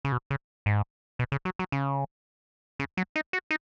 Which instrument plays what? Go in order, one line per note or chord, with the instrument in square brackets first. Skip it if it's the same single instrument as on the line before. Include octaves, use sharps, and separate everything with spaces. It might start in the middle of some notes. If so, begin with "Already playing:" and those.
[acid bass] C#3
B2
C#3
G#2
B2
C#3
F#3
F#3
C#3
C#3
F#3
D#4
F#4
D#4